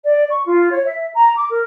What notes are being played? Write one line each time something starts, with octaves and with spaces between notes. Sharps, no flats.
D5
C#6
F4
C#5
E5
A#5
D6
A#4